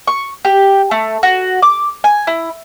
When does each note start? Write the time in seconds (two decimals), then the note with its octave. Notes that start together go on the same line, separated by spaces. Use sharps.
0.07 C#6
0.45 G4
0.91 A3
1.23 F#4
1.62 D6
2.04 G#5
2.27 E4